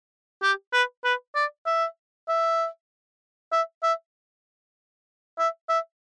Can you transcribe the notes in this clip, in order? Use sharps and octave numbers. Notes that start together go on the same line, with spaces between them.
G4
B4
B4
D5
E5
E5
E5
E5
E5
E5